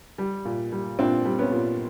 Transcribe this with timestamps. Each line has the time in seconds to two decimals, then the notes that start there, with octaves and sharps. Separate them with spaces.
0.18 G3
0.45 A#2
0.72 G3
0.99 A#2 C4 D4
1.25 G3
1.39 B3 C#4
1.52 A#2